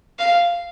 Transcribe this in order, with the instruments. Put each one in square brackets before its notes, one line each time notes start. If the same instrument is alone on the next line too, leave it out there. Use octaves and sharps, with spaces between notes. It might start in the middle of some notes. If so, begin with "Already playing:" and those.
[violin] F5